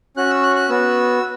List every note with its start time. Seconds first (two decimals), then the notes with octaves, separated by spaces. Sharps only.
0.17 C#4 F#4 F#6
0.30 E6
0.43 F#6
0.56 F#6
0.69 B3 F#4 E6